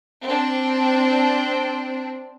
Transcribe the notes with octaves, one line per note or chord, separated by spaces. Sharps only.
C4 D4